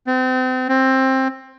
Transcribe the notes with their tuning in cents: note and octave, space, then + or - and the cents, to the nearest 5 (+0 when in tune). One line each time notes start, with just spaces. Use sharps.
C4 -35
C4 +15